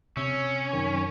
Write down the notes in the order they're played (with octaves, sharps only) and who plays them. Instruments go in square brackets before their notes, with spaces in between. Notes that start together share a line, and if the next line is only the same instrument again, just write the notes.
[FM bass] C3 [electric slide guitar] C#4 [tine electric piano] E6
[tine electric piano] F#2 D#3 C#6